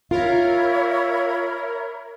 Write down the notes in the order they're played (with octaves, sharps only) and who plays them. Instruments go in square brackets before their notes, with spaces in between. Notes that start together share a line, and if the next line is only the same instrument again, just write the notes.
[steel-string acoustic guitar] F4 [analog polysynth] A#4 [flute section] C#5 E5 B5